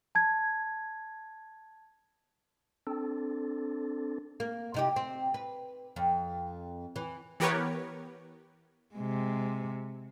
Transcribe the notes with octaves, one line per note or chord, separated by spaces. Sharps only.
A5 G#6
C4 D4 A4
A#3
C3 D#4 G4
C4
B4
F2
E3
E3 B3 G4 A#4 B4 C#5
C3 G#3